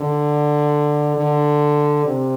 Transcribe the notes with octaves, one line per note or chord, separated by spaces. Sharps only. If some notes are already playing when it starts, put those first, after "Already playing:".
Already playing: D3
D3
C3